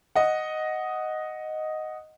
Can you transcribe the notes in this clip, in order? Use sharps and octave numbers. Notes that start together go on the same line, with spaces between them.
D#5 F#5